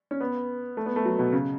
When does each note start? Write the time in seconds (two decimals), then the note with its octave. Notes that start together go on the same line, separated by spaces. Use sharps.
0.11 C#4
0.20 B3
0.77 A3
0.86 B3
0.96 A3
1.05 F#3
1.19 B2
1.33 C#3